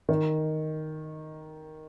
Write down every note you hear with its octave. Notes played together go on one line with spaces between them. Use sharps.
D#3